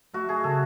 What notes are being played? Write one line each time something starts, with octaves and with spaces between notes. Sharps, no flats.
A3 F#4
A3 G#4
C#3 A4